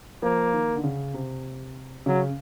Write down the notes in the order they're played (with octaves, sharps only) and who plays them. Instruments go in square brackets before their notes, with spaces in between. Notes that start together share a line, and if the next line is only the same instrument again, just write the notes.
[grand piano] F3 [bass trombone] A#3
[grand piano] D#3
D3
C#3
C3
[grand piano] C#3 [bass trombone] F#3